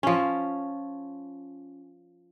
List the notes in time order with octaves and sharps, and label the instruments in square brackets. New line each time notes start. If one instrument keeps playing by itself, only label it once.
[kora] F3 C#4